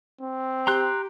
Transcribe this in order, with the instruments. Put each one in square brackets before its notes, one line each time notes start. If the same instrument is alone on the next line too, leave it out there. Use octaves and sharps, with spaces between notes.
[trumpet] C4
[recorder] G4 [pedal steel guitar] A#5 C6 F#6